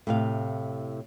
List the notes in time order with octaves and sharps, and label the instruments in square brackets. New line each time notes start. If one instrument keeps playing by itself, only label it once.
[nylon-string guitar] A2 C3 F5